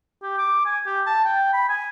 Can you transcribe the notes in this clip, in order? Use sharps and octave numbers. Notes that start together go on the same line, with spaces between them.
G4
D6
G#5
G4
A5
G5
B5
G#5